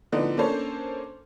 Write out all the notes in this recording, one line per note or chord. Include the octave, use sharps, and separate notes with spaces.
A2 D3 F3 B3 D4 D#4
A#3 C#4 D4 A4 C5 C#5